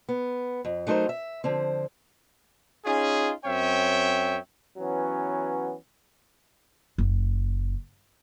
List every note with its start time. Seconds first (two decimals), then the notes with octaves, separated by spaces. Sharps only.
0.09 B3
0.65 F2
0.87 F#3 A3 D#4 A#4 C5
1.09 E5
1.44 D3 F3 C4
2.85 C#4 D#4 F4 G#4
3.45 F#2 C4 C#5 E5 G5
4.78 E3 F#3 B3 C#4
6.98 F#1